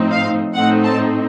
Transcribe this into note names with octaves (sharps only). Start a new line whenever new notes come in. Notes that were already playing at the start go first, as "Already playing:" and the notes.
Already playing: A2 F3 C4 D#4
F5
A2 A3 C4 D#4 F#5
A5